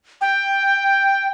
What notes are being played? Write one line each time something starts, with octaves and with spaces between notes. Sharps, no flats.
G5